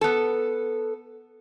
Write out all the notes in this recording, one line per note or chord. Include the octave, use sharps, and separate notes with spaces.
B3 A4